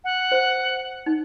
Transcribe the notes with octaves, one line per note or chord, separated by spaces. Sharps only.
F#5
C5
D#4